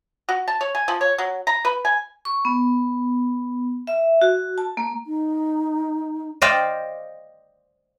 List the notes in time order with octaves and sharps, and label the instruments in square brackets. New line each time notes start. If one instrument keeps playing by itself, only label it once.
[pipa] F#4
A5
C#5
G#5
F3
C#5
F#3
A#5
B4
G#5
[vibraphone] C#6
B3
E5
F#4
A5
A#3
[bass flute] D#4
[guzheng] C5 D5 D#5 F5 G5